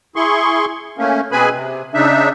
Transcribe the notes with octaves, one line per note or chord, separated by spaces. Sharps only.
E4 G#4 C6 C#6
A3 A#3 C#4
B2 C4 G#4 B4 G#5 B5
C3
C#3 D4 D#4 E5